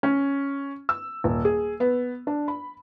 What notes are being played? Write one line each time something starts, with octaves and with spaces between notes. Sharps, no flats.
C#4
E6
D#1
G#4
B3
D4
B5